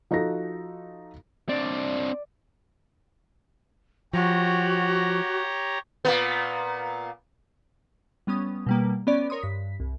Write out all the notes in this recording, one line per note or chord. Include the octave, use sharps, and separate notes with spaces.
F3 D#4 F#4 A4 A#6
C4 D4 D5
F3 F#4 G4 C#5 A#5
A#2 A#3 B3
G3 B3 C#4 D#6
B2 G3 A#3
B3 C#4 D5
A#4 C#5 C6 D#6
G2 B6
C2